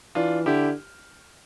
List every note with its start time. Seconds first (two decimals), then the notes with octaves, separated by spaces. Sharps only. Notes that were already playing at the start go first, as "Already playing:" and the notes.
0.15 E3 D4 F4
0.46 D3 E4 G4